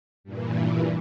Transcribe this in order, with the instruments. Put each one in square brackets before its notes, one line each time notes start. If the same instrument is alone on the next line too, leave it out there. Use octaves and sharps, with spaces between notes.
[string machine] G2 A#2 E3